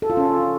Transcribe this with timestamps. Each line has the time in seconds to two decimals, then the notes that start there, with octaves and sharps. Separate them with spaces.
0.02 A4
0.10 F4
0.17 C#4